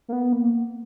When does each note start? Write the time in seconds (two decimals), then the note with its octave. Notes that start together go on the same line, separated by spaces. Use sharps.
0.08 A#3
0.12 B3
0.33 A#3